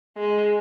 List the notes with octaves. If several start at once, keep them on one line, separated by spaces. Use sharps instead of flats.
G#3